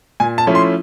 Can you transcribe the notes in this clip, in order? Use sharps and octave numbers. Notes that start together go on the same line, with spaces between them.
A#2 G#5
A5
F3 A3 C#4 E4
C6